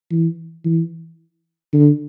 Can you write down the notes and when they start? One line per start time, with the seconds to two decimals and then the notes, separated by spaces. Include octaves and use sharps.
0.11 E3
0.65 E3
1.73 D3